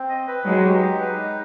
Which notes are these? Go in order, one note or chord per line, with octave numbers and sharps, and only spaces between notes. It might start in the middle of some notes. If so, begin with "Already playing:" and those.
Already playing: C4
D#5
B4
F#3 G#3 D#4
G4
D#5
B4
D#4